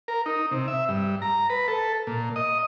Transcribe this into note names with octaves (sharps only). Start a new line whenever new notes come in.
A#4
D#4
C3
E5
G2
A#5
B4
A4
A#2
D#5